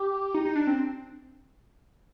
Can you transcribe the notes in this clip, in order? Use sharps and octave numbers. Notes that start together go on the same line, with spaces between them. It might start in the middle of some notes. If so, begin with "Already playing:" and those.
Already playing: G4
D#4
D#4
D4
C4